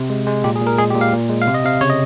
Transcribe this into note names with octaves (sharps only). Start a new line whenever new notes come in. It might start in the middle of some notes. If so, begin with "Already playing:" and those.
Already playing: C3
G#3
G#3
A#2 G4
G#4
A#2
A#4
G#3 G#4
G4
A#2
F5
A#2
G#3
F5
C3
D#5
C3 F5
C#3 C#5
D#5